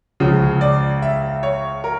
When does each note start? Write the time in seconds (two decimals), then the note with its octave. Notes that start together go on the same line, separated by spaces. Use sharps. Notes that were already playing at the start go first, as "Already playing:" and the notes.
0.20 C#2 C#3 F3
0.61 D5
1.02 E5
1.43 C#5
1.84 A#4